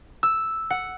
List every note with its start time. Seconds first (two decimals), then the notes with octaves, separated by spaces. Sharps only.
0.23 E6
0.70 F#5